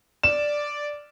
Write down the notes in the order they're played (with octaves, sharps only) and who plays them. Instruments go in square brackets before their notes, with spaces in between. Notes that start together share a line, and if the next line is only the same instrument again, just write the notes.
[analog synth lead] D5 [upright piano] E7